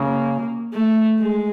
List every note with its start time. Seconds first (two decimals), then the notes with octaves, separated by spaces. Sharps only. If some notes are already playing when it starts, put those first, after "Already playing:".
Already playing: C#3 A#3
0.73 A3
1.19 G#3